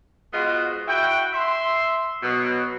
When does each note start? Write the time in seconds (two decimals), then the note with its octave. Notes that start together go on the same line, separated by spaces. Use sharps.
0.33 G#3 B3 F4 F#4 C5 D#5
0.87 E4 F#4 G5
1.33 E5 C6
2.23 B2 F#3